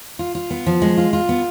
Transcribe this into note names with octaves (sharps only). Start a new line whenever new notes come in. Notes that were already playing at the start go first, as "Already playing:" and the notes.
F4
F4
B3
F3
G#3
F4
F4
B3